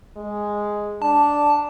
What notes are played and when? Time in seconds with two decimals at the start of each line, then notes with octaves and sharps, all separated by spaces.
0.17 G#3
1.02 D4 A5